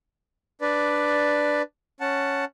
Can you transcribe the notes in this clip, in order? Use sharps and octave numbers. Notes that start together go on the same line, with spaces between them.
D4 B4 D5
C#4 F#5 A5